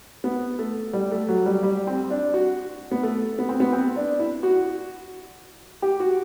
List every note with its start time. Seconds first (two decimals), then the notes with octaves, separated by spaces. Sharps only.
0.24 B3
0.59 A3
0.93 G3
1.11 A3
1.28 F#3
1.46 G3
1.63 G3
1.87 C4
2.10 D4
2.34 F#4
2.91 B3
3.03 A3
3.39 B3
3.49 C4
3.60 B3
3.73 C4
3.96 D4
4.19 E4
4.43 F#4
5.82 G4
6.00 F#4